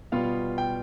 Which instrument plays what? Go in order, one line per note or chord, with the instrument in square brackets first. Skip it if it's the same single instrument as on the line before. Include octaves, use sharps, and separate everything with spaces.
[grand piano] B2 G3 B3 F4 F5
G5